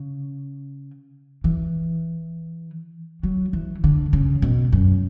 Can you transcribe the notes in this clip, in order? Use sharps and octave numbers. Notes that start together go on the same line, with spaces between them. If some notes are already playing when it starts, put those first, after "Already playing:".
Already playing: C#3
E3
F#3
E3
D3
C#3
B2
F#2